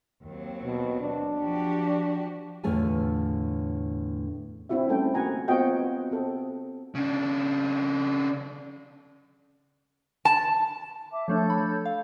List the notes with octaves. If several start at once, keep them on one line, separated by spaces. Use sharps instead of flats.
D#2 F#3 C4
B2
D4
F3 F#4 G4
E2 A2 D3 A3 F4 G#5
C4 D4 E4 F#4 E5
G3 A3 C#4 A4 C5 G5
A#3 F#4 F#5 G#5 A#5
B3 C4 F4 F#4 D#5 G5
C4 A4
C#3 D4
A5
E5 D6
F3 A3 D4 A4 C#5 G6
B5
F5